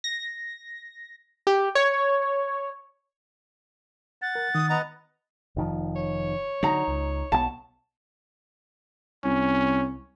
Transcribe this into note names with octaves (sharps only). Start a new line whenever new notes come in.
A#6
G4
C#5
F#5 A6
A#4
D#3 D#6
B3 D#5 F#5 A#5
F1 D#3 F3
C#5
D3 F#3 D#4 A#5
C#2
B1 F3 B3 A5
C2 C#4